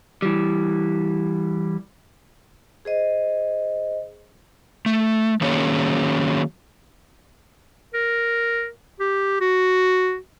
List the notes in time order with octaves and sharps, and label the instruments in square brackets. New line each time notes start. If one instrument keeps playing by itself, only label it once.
[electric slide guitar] E3 G3
[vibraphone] G#4 C5 D#5
[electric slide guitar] A3
D#3 F#3 A#3 C#4 G#4 C#5
[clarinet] A#4
G4
F#4